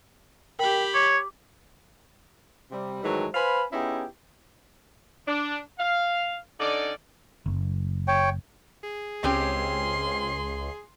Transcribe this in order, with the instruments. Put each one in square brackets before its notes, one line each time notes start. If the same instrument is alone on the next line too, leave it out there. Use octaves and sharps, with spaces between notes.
[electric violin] G4 B5 [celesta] A#4 G5
[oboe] C#5 [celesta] D6
[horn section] C3 G3
G#2 D#3 E3 F#3 G#3 A3
B4 C5 F5 G#5 B5
B3 C#4 D#4 E4 G4 G#4
D4
F5
D3 C#4 D#4 D5
[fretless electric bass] F#1
[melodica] C#5 G5
[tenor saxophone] G#4
[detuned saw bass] C#2 [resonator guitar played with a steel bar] C4 C#4 G4 [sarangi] C6